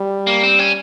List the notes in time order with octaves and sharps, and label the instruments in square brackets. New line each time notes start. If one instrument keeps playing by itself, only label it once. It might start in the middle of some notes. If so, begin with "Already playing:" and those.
Already playing: [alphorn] G3
[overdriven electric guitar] A#3
C4
C#4